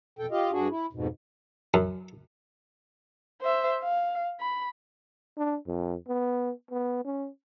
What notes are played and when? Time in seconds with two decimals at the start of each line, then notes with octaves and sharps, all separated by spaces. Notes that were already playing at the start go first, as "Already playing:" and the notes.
0.19 F2 B2 A4 G5
0.31 F4 G4 D#5 F5
0.52 G2 D4 F#4 G#4
0.70 E4
0.93 F2 G#2 B2
1.74 F#2
3.42 C5 E5
3.83 F5
4.40 B5
5.37 D4
5.67 F2
6.08 B3
6.71 B3
7.05 C#4